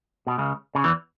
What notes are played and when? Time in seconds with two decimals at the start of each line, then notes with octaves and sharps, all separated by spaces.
0.27 B2
0.38 C#2 C#3
0.75 C#3
0.84 E2 E3